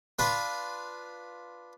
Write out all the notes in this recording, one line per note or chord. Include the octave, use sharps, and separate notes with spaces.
D4 F4 B4